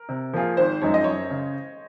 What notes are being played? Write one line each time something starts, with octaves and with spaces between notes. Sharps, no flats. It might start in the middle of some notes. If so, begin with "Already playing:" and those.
Already playing: A#4
C3
F3 A#3 F4 G#4
G#1 C5
F#2 F3 G#3 D#4 C#5
D#5
F#2 C#5
C#3